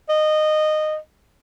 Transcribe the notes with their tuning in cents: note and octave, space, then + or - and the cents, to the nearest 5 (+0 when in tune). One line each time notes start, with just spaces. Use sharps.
D#5 -15